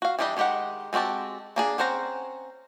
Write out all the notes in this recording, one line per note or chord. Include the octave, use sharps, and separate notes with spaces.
F#4 F5
E3 G3 D4 G4 D#5
D#3 G#3 G4 D#5 F#5
G#3 C4 F#4 G4 A5
A#3 D4 G#4
C4 C#4 C5 F#5 A#5